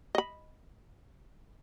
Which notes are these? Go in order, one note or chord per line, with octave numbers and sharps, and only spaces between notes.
D#5 B5